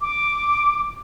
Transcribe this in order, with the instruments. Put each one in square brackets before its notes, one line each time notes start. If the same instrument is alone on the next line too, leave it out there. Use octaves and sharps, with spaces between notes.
[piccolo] D6